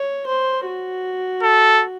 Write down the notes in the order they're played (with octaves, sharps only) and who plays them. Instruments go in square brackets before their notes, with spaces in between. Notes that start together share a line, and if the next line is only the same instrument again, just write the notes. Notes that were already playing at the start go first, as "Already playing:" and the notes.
Already playing: [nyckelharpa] C#5
C5
F#4
[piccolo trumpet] A4